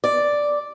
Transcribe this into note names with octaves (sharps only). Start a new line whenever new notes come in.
D5